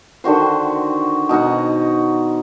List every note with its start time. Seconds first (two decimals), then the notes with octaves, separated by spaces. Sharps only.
0.24 D3 D#3 F#4 C5
1.29 B2 D#4 F#4 F#5